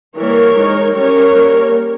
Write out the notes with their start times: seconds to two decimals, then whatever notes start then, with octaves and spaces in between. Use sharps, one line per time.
0.17 E3 G3 A#3 A#4 C#5
0.56 G#3 D#4
0.95 G3 C#4 A#4 C#5
1.34 G3 A#3 C#4